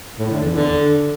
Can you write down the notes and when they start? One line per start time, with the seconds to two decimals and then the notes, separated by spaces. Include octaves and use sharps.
0.19 A2
0.31 D3
0.43 E2
0.55 D3